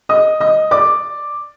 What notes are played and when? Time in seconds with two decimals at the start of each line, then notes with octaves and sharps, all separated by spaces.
0.09 D#5 D#6
0.40 D#5 D#6
0.71 D5 D6